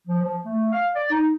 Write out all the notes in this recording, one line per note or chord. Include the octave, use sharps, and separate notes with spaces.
F3
F3
A3
F5
D5
D#4